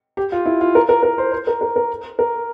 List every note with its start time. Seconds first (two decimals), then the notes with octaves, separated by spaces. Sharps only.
0.17 G4
0.32 F4
0.46 E4
0.61 F4
0.75 A#4
0.89 A#4
1.03 A#4
1.18 C5
1.32 C5
1.47 A#4
1.61 A#4
1.76 A#4
2.19 A#4